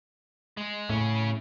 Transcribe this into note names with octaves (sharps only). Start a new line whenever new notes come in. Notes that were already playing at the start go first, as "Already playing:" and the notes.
G#3
A2 C#3 C#4